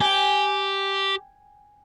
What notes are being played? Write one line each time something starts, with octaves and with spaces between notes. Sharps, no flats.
G4 G5 G#5